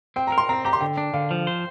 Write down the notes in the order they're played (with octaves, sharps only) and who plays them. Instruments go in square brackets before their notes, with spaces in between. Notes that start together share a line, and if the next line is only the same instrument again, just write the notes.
[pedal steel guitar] C4 [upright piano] G5
[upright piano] A#5
[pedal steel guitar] A#4
[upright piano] C6
[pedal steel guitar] C4 [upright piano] A#5
[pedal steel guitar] G4 [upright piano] A#5
[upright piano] C6
[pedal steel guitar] D3 [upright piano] G5
[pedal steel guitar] D4
[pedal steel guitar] D3 [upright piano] F5
[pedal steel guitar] F3
C5